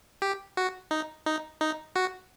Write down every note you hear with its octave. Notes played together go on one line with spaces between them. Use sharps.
G4
F#4
D#4
D#4
D#4
F#4